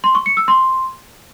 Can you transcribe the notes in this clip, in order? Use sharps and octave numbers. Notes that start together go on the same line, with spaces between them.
C6
C#6
C#7
E6
C6